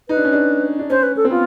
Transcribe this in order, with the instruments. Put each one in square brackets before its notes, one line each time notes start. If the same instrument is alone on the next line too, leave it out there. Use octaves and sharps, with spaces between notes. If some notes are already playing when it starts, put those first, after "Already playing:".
[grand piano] D#4 [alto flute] B4
[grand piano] D4
C#4
D4
D4
[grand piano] C#4 [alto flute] C5
[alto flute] B4
A4
[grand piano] C4
[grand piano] B3 [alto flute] F4